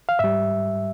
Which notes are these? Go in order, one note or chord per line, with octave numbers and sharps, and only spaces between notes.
F5
G#2 G3 E5